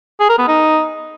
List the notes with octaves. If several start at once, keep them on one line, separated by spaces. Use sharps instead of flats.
G#4
A#4
B3
D#4